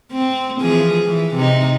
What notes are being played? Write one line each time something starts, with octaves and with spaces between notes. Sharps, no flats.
C4
E3 F3 G#4
E3
C3 D#4